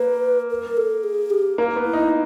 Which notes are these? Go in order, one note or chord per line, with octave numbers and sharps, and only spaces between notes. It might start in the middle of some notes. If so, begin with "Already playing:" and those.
Already playing: A#3 B4
A#4
A4
G#4
G4
A#3
B3
E4
D#4